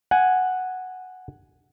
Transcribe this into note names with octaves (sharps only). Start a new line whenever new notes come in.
F#5 G#5